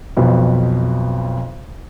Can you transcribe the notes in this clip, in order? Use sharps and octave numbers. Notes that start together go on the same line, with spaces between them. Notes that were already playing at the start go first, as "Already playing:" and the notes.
B1 F2 B2